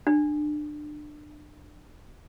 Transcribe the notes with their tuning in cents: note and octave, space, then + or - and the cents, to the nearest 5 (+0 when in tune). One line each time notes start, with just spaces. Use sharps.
D4 +30